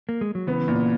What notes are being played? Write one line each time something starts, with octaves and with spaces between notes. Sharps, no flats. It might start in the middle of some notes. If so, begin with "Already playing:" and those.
A#3
G#3
F#3
C#3 E3 B3
A#2